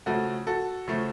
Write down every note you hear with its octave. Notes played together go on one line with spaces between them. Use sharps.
C#3 F3 A3 F#4 A4
F#4 A4
C#3 F3 A3